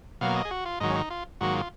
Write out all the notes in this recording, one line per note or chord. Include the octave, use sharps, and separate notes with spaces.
B2 F#3 A#3 F5
D#5
G#4
F#4
F4
G#2 D#3 F#3 D#4
C#4
D#4
F4
G#2 D#3 F#3 A#3 F#4
F4